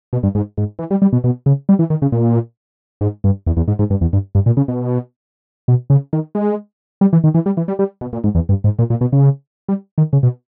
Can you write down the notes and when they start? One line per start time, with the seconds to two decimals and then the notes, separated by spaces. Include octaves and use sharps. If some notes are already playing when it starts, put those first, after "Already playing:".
0.13 B2
0.23 G2
0.35 G#2
0.57 G#2
0.79 E3
0.91 G3
1.02 G3
1.13 B2
1.24 B2
1.46 C#3
1.69 G3
1.79 E3
1.90 D#3
2.02 C#3
2.12 A#2
3.01 G#2
3.24 G2
3.47 E2
3.57 E2
3.68 G#2
3.79 G#2
3.90 G2
4.01 E2
4.13 G2
4.35 G2
4.46 A#2
4.57 C#3
4.68 B2
5.68 B2
5.90 C#3
6.13 D#3
6.35 G#3
7.01 G3
7.13 E3
7.24 D#3
7.34 E3
7.46 G3
7.57 E3
7.68 G3
7.79 G3
8.01 B2
8.13 A#2
8.24 G#2
8.35 E2
8.49 G2
8.64 G#2
8.79 A#2
8.90 A#2
9.01 B2
9.12 C#3
9.68 G3
9.98 D#3
10.13 C#3
10.23 B2